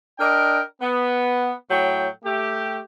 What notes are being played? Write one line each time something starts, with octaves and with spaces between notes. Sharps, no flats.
D4 A#4 D#5 G5
B3
A2 F#3 G5
A3 G4